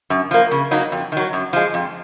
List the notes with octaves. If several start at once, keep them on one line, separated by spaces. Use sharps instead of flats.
F#2
F3 A#3
C#3
F#3 A#3 D#4
F2
D#3 F#3
F#2
F3 G#3
F2